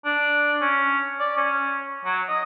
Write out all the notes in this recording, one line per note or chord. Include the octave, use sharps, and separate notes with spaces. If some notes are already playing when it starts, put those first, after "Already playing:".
D4
C#4
D5
C#4
F#3
D#5